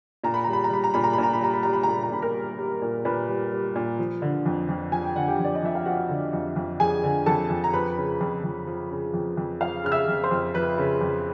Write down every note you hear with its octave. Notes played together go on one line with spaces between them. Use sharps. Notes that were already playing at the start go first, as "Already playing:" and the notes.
A#2 A#5
B5
G3 A#5
B5
A#5
G3 B5
A#5
A#2 B5
A#5
A#2 B5
A#5
B5
G3 A#5
B5
G3 A#5
B5
A#2 A#5
B5
A#5
A#2 B5
A#4 A#5
G3
G3
A#2
A#2 B4 B5
G3
G3
A#2
F3
D3
F2
F2
F3 G#5
G5
D3 F#5
G4 G5
F2
D5
D#5
F2 E5
F5
F3 F#4 F#5
D3
F2
F2
F3 G#4 G#5
D3
F2 A4 A5
F2
A#5
F3 B4 B5
C#3
F2
F2
F3
C#3
F2
F2
F3 F5 F6
C#3 F6
E5 E6
F2
C5 C6
F2
F3 B4 B5
C#3
F2